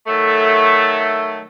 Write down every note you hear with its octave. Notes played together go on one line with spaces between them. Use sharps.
D#3 F#3 A3